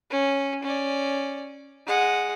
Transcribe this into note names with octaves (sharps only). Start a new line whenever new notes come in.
C#4
C#4 D5
G#3 F#5